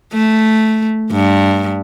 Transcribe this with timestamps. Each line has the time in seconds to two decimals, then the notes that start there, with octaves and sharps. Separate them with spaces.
0.13 A3
1.11 G2